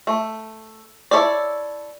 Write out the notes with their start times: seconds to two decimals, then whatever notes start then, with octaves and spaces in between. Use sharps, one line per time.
0.07 A3
1.11 E4 A4 C#5 D5